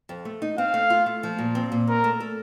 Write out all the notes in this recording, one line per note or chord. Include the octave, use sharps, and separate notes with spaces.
F2
A3
D#4
C4 F5
A3
F4
A3
F3
A#2
C4
A#2
C#4 A#4
A3
A4